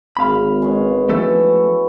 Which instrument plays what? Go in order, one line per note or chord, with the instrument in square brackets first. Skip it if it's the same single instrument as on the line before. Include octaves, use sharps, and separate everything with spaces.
[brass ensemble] G#1 [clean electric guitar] F5 B5
[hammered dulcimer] G#3 B3 C#4
[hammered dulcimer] E3 F#4 [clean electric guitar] F3 A3 A4